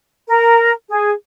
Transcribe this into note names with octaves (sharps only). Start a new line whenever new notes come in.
A#4
G#4